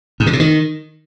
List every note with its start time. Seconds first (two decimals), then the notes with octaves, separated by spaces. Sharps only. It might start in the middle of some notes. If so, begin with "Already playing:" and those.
0.20 G#2
0.27 D3
0.33 C3
0.40 D#3